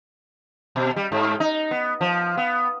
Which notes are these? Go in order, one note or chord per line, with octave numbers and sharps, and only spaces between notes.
B2
G3
G#2
D#4
B3
F3
B3